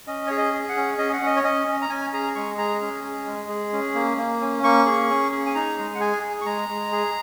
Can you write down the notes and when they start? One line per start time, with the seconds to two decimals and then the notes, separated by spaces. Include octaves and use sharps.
0.07 C#4 D#5
0.27 G#4 C#5
0.38 D#5
0.53 G#4
0.69 F#5
0.76 C#4
0.98 C#4 D#5
1.13 F#5
1.22 C#4 D#5
1.36 C#5
1.44 C#4 D#5
1.68 C#4
1.82 A#5
1.89 C#4 G#5
2.13 G#4 A#5
2.35 G#3 C#6
2.58 G#4 A#5
2.81 C#4
3.04 G#4
3.26 G#3
3.49 G#4
3.72 C#4
3.95 A#3
4.18 A#3
4.41 C#4
4.63 A#3 C#6
4.86 G#4
5.10 C#4
5.32 G#4
5.46 G#5
5.55 D#4 A#5
5.78 G#3
5.95 F#5
6.00 G#4 G#5
6.23 G#4
6.41 C#6
6.46 G#3 A#5
6.69 G#3
6.92 G#4